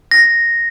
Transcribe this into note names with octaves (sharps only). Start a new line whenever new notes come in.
A#6